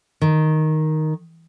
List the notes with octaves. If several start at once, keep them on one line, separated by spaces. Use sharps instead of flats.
D#3